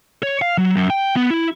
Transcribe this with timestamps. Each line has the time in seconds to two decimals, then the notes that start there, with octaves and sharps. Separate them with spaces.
0.23 C#5
0.42 F5
0.58 F#3
0.76 F#2
0.90 G5
1.16 B3
1.30 E4